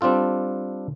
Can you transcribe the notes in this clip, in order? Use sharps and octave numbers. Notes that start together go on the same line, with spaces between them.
G3 C4 D4 F4 A4